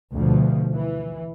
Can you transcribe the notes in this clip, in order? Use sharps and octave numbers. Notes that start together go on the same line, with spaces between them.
D2 B2 F3
E3